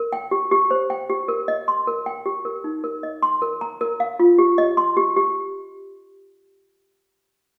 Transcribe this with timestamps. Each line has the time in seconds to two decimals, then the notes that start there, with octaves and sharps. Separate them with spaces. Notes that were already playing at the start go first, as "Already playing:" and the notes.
Already playing: A#4
0.13 G5
0.31 G4
0.51 G4
0.71 C5
0.90 G5
1.10 G4
1.28 A#4
1.48 D#5
1.68 C6
1.87 A#4
2.06 G5
2.26 G4
2.45 A#4
2.64 D#4
2.84 A#4
3.03 D#5
3.22 C6
3.42 A#4
3.61 A#5
3.81 A#4
4.00 F5
4.19 F4
4.38 G4
4.58 D#5
4.77 C6
4.97 G4
5.17 G4